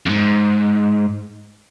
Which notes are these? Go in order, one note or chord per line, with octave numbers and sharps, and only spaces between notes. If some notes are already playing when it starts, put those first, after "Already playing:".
F2 G#2